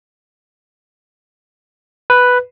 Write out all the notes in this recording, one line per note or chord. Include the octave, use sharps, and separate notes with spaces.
B4